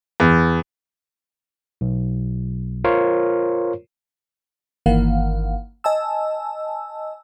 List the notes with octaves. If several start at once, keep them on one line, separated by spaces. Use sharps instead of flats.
E2
B1
F4 A#4 C5 C#5
G1 D#3 E3 A#3 F5 F#5
D#5 G#5 A5 E6